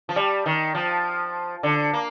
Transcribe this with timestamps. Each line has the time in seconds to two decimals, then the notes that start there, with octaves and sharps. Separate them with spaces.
0.09 F3
0.16 G3
0.46 D#3
0.75 F3
1.63 D3
1.93 A#3